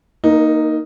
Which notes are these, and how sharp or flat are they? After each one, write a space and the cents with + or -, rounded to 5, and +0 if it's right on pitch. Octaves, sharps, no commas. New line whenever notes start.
A#3 -5 D#4 +0 A#4 +40